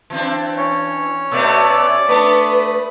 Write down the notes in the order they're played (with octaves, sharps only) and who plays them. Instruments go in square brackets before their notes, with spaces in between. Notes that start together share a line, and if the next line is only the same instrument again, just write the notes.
[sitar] E3 C4 D4
[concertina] C#4 C#5
[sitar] B2 A3 B3 [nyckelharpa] D5 [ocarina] E6
[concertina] A3 B5 D#6 [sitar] B3 D4 A4 [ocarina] B4